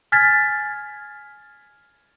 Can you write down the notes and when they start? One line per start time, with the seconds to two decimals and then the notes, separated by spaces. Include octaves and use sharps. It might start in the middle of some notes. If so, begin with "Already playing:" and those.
0.12 G#5 F6 G#6 A6 B6